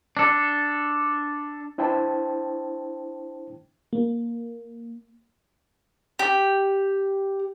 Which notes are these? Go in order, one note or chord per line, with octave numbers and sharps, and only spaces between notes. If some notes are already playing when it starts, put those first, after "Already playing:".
D4 A4
D4 E4 C5 G5 A5
A#3
G4